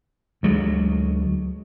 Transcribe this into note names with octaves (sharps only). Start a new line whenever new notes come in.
D2 F#3 G#3